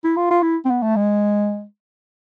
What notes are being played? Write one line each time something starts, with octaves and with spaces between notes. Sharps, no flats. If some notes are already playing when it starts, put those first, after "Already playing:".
E4
F4
F4
E4
C4
B3
A3
G#3